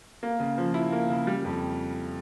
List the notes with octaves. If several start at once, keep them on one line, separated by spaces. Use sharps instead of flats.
A#3
C#3
F3
E4
A#3
C#3
G3
F2